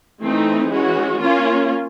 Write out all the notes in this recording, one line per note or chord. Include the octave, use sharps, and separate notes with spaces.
E3 A3 C4 D#4
E3 G#3 C#4 F#4
A#3 C#4 F4